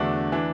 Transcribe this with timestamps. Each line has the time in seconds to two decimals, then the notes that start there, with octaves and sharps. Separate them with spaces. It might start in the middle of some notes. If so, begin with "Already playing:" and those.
Already playing: E2 D3 A3 D4 F#4
0.32 E3 D4